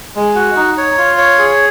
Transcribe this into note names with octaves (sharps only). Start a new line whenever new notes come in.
G#3
F#4
D#4
C#5
F4
C#5
G#4